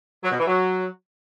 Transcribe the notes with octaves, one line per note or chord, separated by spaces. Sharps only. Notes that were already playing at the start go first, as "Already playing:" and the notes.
F#3
B2
E3
F#3